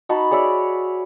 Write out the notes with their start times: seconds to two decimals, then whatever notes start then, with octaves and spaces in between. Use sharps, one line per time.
0.09 D#4 F#4 A5 B5
0.31 G#4 C#5 D5 E5